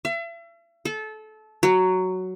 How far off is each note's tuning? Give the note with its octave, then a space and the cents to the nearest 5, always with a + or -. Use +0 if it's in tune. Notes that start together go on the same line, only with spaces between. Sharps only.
E5 +40
A4 -25
F#3 +5